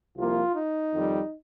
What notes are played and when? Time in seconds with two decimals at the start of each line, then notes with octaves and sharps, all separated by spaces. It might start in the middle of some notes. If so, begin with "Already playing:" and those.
0.16 C2 C3 F3 A#3 F4
0.54 D#4
0.93 F2 D#3 G3